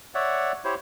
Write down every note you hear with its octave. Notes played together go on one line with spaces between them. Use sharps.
C#5 D5 E5 F#5
E4 G4 C5 C#5